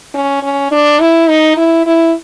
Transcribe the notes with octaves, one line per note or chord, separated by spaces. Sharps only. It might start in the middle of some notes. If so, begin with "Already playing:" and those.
C#4
C#4
D4
E4
D#4
E4
E4